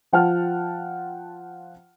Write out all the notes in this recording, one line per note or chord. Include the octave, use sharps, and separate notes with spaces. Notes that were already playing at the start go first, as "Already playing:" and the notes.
F3 F4 F#5 G5 A5 F6